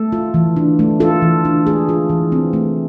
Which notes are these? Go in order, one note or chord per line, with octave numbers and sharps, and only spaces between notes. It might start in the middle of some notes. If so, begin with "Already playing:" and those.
Already playing: A3 A4
F4
E3
D4
A3
F4 A4
E3
D4
A3 G#4
F4
E3
C4
A3